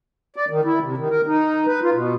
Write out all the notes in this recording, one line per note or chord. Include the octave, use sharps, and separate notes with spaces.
D5
D#3
E4
C3
D#3
A#4
D#4
B4
F4
B2